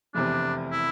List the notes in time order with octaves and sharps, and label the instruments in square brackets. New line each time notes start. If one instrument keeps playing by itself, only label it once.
[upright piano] F1 E2 C3 [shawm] D4
[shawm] E4